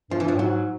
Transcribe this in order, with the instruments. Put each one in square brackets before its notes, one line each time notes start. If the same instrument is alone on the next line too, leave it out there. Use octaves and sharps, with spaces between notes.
[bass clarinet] G2 [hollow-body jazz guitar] F3
[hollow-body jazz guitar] E3
F3
[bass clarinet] A2
[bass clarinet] G#2 [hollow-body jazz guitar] F#3